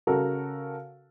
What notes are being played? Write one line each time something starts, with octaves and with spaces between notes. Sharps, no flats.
C#3 F#4 A4 A#4